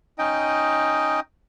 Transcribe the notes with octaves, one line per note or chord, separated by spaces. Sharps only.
C#4 D#4 D#5 G5